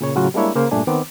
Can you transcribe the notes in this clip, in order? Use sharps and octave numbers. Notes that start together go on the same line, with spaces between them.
A#2 C#3 C#5
A2 C#3 F#3 F4 F#4
G3 G#3 A#3 D4 E4 C#5
C#3 A#3 C5
G2 A#2 A3 D4 G#5
D#3 B3 C4 D6